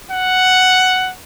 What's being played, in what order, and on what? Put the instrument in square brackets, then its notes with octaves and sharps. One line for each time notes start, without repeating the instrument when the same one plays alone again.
[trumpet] F#5